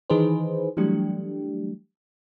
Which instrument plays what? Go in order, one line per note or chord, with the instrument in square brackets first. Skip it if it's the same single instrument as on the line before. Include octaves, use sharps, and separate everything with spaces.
[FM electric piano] D#3 E3 D#4 G#4 B4 C5
E3 F#3 G3 A3 D4 G4